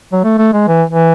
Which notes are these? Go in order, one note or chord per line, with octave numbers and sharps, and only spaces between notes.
F#3
A3
A3
G#3
E3
E3